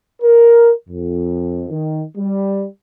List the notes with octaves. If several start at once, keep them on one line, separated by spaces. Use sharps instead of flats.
A#4
F2
D#3
G3